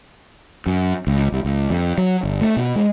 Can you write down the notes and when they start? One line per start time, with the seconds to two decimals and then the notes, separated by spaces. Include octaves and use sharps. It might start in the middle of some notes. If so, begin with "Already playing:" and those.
0.66 F#2
1.07 C#2
1.32 C2
1.45 C#2
1.70 F2
1.98 F#3
2.23 G1
2.41 A3
2.57 B2
2.75 G#3